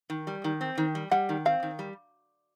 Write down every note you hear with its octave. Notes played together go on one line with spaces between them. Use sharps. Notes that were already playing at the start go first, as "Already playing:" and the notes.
D#3
G3
D#3
C4
D#3
G3
G3 F#5
D#3
C4 F5
D#3
G3